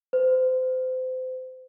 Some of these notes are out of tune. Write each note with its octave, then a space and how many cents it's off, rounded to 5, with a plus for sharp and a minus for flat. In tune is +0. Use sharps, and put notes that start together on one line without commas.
C5 -30